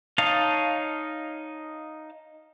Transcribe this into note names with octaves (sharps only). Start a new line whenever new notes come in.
D#4 C#5 D#5 F5 A5